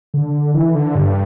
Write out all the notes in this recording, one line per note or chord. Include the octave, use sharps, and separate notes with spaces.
D3
E3
D3
G2